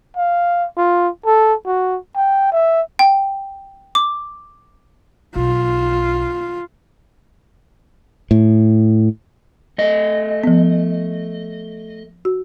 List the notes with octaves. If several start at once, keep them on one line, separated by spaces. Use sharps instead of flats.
F5
F4
A4
F#4
G5
E5
G5
D6
B1 F4
A2
A3 D#5
F3 B3
F#4